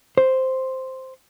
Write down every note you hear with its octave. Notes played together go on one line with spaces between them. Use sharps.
C5